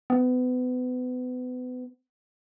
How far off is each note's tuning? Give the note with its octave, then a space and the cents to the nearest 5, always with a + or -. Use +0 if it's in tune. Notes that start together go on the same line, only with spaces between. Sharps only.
B3 +30